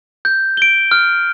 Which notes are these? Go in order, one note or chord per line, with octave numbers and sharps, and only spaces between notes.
G6
D7 G7
F6